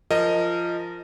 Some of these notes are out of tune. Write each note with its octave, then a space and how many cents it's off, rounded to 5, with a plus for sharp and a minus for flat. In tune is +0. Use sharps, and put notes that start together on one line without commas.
F3 -10 A#4 -25 D#5 +0